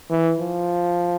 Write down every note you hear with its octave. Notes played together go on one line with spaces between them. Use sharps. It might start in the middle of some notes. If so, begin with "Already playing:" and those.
E3
F3